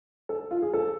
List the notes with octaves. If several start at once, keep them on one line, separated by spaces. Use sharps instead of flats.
A4
F4
G#4
A4